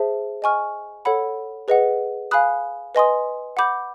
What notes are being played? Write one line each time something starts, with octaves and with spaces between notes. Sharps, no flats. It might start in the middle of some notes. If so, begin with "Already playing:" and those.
Already playing: G#4 C5 E5 A5
D#5 G#5 C#6 F6
A4 C#5 F#5 B5
G#4 B4 D#5 F#5
F5 G#5 B5 D#6 F#6
B4 D#5 G#5 C6 D#6
F#5 B5 D6 G6